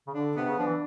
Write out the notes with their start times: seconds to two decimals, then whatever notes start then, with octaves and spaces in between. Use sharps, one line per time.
0.07 C#3
0.14 D3 D4
0.36 C3 B3
0.47 C#3
0.58 F3 D4
0.66 E3